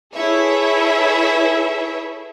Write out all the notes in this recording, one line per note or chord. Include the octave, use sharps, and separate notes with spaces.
E4 G#4 A4 B4 C#5 E5